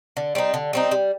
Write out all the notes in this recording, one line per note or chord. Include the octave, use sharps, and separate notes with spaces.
D3
G3 C4 D#4
D3
G3 C4 D#4
G3